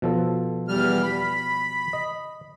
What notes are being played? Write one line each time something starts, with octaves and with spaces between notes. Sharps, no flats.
B2 F3 A4
E2 G3 F6
B5
D#5